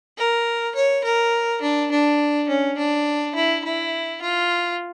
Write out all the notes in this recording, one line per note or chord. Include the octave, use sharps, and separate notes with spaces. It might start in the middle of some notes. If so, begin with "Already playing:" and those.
A#4
C#5
A#4
D4
D4
C#4
D4
E4
E4
F4